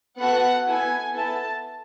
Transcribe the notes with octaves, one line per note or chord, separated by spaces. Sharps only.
B3 F#4 A4 F#5
B3 E4 A4 G#5
B3 E4 A4 A5